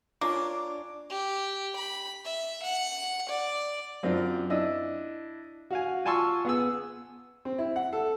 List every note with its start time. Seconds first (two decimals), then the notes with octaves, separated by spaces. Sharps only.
0.21 A#3 D4 F4 C#5 G#5 D6
1.09 G4
1.76 B5
2.25 E5
2.62 F#5
3.29 D5
4.03 F#2 C4 D4 F4
4.50 D4 E4 D#5 E6
5.71 F#4 F5 G#5
6.05 F4 G#5 A5 C6 C#6 E6
6.45 B3 G#4 E6
7.45 C4
7.58 E4
7.76 F#5
7.93 A4